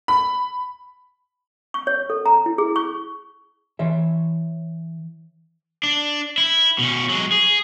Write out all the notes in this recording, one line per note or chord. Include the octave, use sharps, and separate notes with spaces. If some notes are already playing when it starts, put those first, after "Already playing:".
B5
C#6
C#5
A4
A#5
E4
G#4
C#6
E3 C#5 E5
D4
E4
B2 C#4
F#3 G#3
G#4